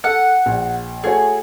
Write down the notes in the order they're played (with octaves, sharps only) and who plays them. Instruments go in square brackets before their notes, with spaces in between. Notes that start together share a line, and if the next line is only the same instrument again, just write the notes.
[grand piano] A4 [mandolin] F#5
[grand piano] A#1
[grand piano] A3 F#4 C#5 [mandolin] G#4